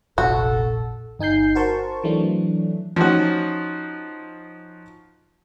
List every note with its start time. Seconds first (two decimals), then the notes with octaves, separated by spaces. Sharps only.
0.18 F1 A#1 C3 F#4 A4
1.19 G1 D#4 G#5 G6 C7
1.55 F#4 A#4 C5 A5 C#6
2.04 E3 F#3 A3 D4
2.96 F3 C#4 D#4 F#4